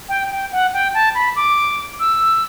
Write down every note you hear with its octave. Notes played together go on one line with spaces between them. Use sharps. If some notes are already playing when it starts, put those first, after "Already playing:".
G5
G5
F#5
G5
A5
B5
D6
E6